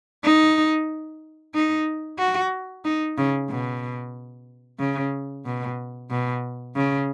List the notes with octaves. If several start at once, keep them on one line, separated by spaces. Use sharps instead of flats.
D#4
D#4
F#4
D#4
C#3
B2
C#3
B2
B2
C#3